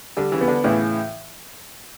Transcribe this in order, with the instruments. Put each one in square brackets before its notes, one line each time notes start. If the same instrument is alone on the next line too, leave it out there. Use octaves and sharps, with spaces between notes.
[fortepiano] D3 [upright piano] G3
[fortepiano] C#3 E3
[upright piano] B3
[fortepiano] D3
[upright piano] A2 [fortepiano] C#3 E3